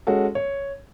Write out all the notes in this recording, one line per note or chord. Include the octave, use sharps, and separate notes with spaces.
G#3 C#4 F#4 A4
C#5